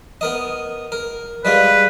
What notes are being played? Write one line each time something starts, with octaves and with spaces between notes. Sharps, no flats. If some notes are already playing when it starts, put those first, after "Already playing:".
B3 A#4 D#5
A#4
G3 G#3 F4 B4